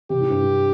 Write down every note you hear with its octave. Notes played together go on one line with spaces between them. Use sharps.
C3 G4
A2
G2
A2